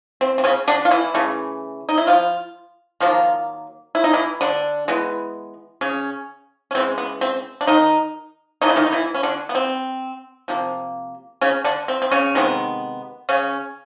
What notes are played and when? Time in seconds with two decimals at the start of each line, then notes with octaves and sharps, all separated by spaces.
0.21 C4
0.38 C4
0.44 C#3 C#4
0.68 D3 D4
0.85 F4
0.91 E3 E4
1.14 C#3 E3 A3
1.89 D#4
1.98 E4
2.07 F3 F4
3.00 D#3 F3 F#3 A#3 F4
3.95 E4
4.04 D#4
4.13 E3 E4
4.41 D3 D4
4.88 E3 G#3 B3
5.81 C#3 C#4
6.71 C#4
6.75 C#3 E3 G#3 C4
6.98 B3
7.21 C4
7.61 D4
7.67 D#3 D#4
8.61 C#3 E3 A3 D#4
8.69 E4
8.76 D#3 D#4
8.86 D#4
8.92 E3 E4
9.14 C#4
9.23 D3 D4
9.49 B3
9.55 C4
10.48 C3 F3 A#3
11.41 C#3 C#4
11.64 D3 D4
11.88 C4
12.02 C4
12.11 C#3 C#4
12.35 C3 D#3 G#3 B3
13.29 C#3 C#4